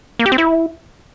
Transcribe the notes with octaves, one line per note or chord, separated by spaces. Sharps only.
A#3
G4
C4
E4